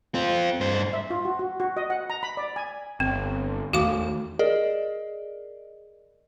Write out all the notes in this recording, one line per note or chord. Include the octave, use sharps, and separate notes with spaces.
C4 F4
G2 C5
E5
F4
F#4
F#4
F#4
D#5
F#5
A#5
B5
D5
G#5
G1 C4
E2 D#3 A3 F#4 F5 D6
G#4 A#4 D5 D#5